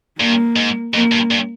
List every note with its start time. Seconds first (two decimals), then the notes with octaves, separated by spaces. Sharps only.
0.19 G2 A#3
0.56 G#2
0.94 F2 A#3
1.12 G2
1.31 G2